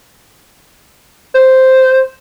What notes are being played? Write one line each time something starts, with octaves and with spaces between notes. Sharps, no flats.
C5